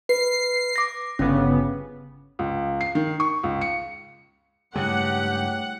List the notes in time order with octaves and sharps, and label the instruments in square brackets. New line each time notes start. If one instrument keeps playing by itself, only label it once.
[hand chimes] B4 [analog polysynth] C7
[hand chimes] D6 A#6
[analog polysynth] G1 C#3 B3 [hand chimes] C#4
[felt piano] C#2
C7
D#3
C#6
C#2
C#7
[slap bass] G2 C#3 G#3 [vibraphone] A3 E4 C#5 [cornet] G4 [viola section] F#5